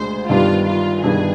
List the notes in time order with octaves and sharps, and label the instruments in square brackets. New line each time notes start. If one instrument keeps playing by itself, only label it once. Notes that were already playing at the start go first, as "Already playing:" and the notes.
Already playing: [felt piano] D2 D3 G#3 D4 [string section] C5
[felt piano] G1 G2 D#3 G3 D4 [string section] F4
[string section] F4
[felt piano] G1 G2 D#3 G3 D4 [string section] G#4